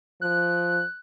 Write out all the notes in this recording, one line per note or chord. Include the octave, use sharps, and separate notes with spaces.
F3 F#6